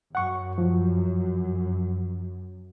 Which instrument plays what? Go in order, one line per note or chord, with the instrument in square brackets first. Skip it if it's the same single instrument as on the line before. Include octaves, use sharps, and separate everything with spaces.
[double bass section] F#2 [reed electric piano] F#5 C#6
[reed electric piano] F3